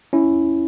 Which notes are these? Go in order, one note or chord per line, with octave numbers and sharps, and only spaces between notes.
C#4 E4